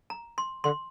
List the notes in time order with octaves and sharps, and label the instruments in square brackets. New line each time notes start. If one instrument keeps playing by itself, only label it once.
[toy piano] A#5
C6
[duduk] D3 [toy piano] C6